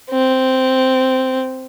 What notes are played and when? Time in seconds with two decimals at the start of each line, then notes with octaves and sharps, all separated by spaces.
0.10 C4